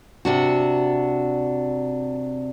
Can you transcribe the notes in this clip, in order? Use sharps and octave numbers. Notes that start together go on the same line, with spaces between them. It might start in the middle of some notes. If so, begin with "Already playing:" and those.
C3 D4 F#4